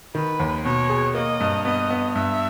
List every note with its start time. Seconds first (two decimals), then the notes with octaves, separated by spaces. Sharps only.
0.15 D#3 B4
0.40 D#2
0.65 B2 C#5
0.89 G#4
1.15 A#3 D#5
1.40 G2
1.65 B3 D#5
1.90 B3
2.15 G2 E5